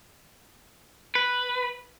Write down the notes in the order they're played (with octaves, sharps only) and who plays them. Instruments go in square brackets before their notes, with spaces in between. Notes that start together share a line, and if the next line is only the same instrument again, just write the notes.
[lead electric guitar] B4